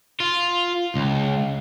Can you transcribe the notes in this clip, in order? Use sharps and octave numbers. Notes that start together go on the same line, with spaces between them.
F4
C#2